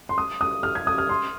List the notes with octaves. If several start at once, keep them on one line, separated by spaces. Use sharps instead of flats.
C6
D#6
D#6
F6
G#6
D#6
F6
C6